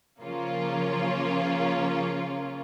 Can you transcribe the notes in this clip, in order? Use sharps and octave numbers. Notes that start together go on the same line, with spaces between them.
C#3 F3 A#3 C#4 F4